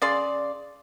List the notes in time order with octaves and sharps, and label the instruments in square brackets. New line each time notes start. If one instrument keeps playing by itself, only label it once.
[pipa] C#3 D5 C6